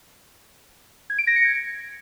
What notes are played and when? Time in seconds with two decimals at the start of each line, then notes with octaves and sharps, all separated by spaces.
1.10 G#6
1.19 D7
1.27 A#6
1.36 C#7
1.45 G#6